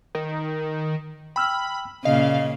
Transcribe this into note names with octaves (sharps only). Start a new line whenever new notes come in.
D#3
G5 B5 E6 F6
A#2 C#3 D#5 F5